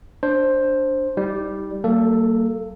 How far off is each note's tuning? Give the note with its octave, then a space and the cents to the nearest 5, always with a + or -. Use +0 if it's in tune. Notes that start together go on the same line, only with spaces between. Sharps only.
D4 +0 C5 +10
G3 +0 D#4 +35
F#3 +40 A#3 -30 A4 +0